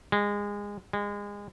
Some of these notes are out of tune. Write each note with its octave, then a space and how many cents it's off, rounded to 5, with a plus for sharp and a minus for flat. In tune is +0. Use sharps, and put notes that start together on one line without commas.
G#3 -25
G#3 -30